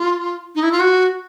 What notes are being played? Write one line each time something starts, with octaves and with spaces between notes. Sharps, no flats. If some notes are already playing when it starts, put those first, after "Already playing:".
Already playing: F4
D#4
E4
F4
F#4